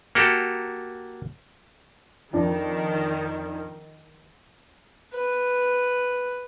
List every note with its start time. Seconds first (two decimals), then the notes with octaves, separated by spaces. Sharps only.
0.15 A#3 F#4 G4 A4
2.33 F2 D#3 D4
5.13 B4